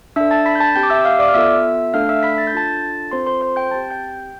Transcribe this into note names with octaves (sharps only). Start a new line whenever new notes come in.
D4 A4 E5 E6
A5 A6
B5 B6
G6
A5 A6
C4 G4 G5 G6
D6
E5 E6
F5 F6
D5 D6
F6
B3 F4 A4 E5 E6
A3 D4 A4 F5 F6
E5 E6
B5 B6
A6
G6
D4 F4 A4 A5 A6
C4 F4 A4 C5 C6
C5 C6
C5 C6
G5 G6
C4 G4 A5 A6
G5 G6